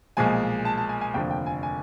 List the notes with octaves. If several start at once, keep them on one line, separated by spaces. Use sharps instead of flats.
B1 A#2 F3 G#3 G#5
A5
A5
G#5
G#5
F1 D#2 D3 F3 G5
G5
G#5
G#5